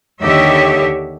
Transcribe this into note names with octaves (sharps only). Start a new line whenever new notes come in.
D#2 D3 G4 C#5 D#5 E5